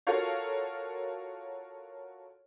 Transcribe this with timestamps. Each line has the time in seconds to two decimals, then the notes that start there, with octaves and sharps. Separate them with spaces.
0.07 F4 F#4 A4 A#4 C#5 F5